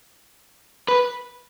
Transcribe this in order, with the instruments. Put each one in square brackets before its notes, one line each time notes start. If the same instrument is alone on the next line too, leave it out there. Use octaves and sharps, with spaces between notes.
[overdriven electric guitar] B4